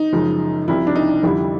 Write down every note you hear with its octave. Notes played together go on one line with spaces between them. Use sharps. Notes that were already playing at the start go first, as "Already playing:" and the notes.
Already playing: D#4
F#2 C#3 F3 G#3
C2 C3 F3 E4
D4
D#4
F2 D3 G3 E4